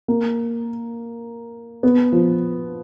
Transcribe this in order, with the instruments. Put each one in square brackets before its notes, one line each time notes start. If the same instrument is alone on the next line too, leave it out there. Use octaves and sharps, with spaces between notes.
[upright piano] A#3
B3
F3